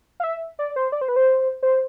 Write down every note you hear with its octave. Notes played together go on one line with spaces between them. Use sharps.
F5
E5
D5
C5
D5
C5
B4
C5
C5